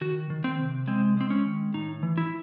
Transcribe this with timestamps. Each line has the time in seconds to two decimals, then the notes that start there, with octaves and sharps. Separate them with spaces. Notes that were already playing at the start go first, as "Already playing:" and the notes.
0.01 D#3 F#4
0.30 D#3
0.44 C4
0.59 C3
0.87 G#3 C4
1.17 G#3 C4
1.30 C#4
1.45 D#3
1.74 A2 D#4
2.03 E3
2.18 E4